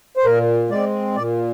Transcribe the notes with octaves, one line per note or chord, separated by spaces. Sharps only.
C5
A#2 A#4
G#3 C4 D5
A#2 D5